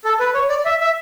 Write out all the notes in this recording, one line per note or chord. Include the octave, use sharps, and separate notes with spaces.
A4
B4
C#5
D5
E5
E5